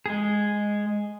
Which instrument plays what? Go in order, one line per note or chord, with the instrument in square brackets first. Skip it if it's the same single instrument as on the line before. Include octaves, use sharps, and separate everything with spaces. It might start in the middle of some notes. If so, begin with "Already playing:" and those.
[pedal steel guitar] G#3 G#4